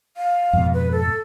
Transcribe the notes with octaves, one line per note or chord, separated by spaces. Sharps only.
F5
F2 G#2 B2
B4
A4